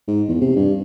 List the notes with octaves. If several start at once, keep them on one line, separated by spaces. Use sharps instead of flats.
G#2
E2
C3
G2